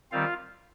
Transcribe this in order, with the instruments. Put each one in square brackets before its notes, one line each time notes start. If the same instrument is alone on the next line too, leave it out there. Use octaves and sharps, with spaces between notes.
[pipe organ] D#3 G3 C4 F4 F5